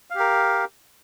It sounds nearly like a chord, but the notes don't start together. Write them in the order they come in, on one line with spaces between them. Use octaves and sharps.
F5 G4 A#4